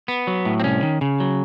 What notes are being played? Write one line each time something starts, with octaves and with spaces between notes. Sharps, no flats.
B3
F#3
A2
C4
C2 C#4
D#3
C#3
F#3